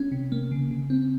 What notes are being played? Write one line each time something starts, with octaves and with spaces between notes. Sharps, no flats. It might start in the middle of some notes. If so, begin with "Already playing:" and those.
Already playing: C#4
C3
A#3
C#3
C#3
C4